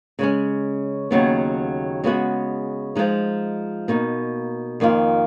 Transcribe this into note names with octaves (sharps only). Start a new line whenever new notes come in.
C#3 G#3 C#4
D#2 C#3 F#3 B3
C#3 G#3 B3 F#4
F3 G#3 D#4
B2 A#3 D#4
F2 D#3 A#3 F4